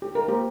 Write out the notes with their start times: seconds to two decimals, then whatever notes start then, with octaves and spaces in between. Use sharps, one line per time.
0.02 G4
0.15 A#4
0.28 A#3 G4 C5